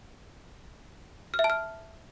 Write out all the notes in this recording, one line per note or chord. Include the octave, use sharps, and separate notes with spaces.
F6
E5
A5
F6